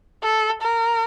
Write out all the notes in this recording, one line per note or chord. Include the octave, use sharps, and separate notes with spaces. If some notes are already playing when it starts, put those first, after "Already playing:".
A4
A#4